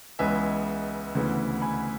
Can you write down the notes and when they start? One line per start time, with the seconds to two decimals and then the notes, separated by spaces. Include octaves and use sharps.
0.19 C#2 C#3 E3 G#3 B3 E5 G#5
1.15 D2 C#3 E3 B3
1.62 G#5 B5